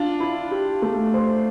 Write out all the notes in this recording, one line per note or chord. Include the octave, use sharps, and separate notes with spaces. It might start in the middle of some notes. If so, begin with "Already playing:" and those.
Already playing: D4 F4
E4
G4
A3
C5